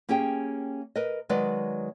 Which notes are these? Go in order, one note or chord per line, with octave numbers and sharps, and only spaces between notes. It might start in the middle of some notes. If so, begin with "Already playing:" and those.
A#3 C#4 G4 G#4 G5
A#4 B4 D#5
D#3 F#3 G#3 B4 D5 D#5